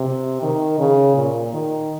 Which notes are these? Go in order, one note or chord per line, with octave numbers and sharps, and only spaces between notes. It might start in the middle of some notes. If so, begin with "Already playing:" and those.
Already playing: C3
D#3
C#3
A#2
D#3